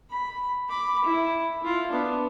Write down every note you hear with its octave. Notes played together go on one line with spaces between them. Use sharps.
B5
B5 D6
E4
E4 F4
B3 D4